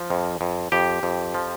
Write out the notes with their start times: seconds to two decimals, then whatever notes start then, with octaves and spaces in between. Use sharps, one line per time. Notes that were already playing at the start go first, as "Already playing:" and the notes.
Already playing: F3
0.10 F2
0.41 F2
0.72 F2 G4
1.03 F2
1.34 F3